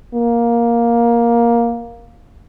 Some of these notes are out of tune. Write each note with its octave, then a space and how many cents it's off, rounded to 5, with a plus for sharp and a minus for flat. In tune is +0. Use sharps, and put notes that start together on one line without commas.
A#3 +10